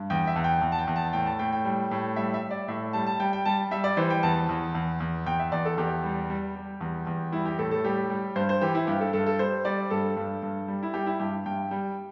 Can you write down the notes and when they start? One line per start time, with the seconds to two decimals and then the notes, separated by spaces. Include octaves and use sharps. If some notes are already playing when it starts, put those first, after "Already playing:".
Already playing: G2
0.10 E2 G5
0.27 E5
0.36 E2
0.44 G5
0.62 E2
0.72 A5
0.79 G5
0.87 E2
0.96 A5
1.13 A2 G5
1.26 A5
1.39 A2 G5
1.52 G5
1.65 G3
1.91 A2
2.16 G3 E5
2.34 E5
2.43 G3
2.51 D5
2.68 A2 E5
2.93 G3 A5
3.06 A5
3.20 G3 G5
3.33 G5
3.45 G3 A5
3.71 G3 E5
3.84 D5
3.97 E3 C5
4.10 G5
4.23 E2 A5
4.49 E2
4.75 E2
5.00 E2
5.26 E2 G5
5.39 E5
5.52 E2 D5
5.65 A4
5.78 E2 G4
6.04 G3
6.30 G3
6.55 G3
6.81 E2
7.07 E2
7.32 G3 E4
7.45 G4
7.58 A2 A4
7.71 A4
7.84 G3 G4
8.10 G3
8.36 G2 C5
8.49 C5
8.61 E3 G4
8.75 E4
8.87 G2 G4
9.01 A4
9.13 G2 A4
9.26 A4
9.39 G3 C5
9.65 G3 D5
9.91 G2 A4
10.17 G2
10.42 G2
10.68 G3
10.83 E4
10.94 G3 G4
11.06 E4
11.20 G2 G4
11.46 G2 G5
11.71 G3